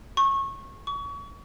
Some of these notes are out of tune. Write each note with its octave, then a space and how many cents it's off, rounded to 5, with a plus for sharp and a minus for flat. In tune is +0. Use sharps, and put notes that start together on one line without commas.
C#6 -20
C#6 +30